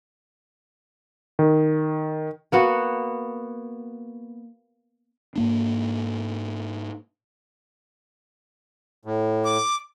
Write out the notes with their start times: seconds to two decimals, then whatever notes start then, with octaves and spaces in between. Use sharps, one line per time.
1.39 D#3
2.52 A#3 B3 F#4
5.36 G#2 A#3 D4
9.05 A2
9.44 D6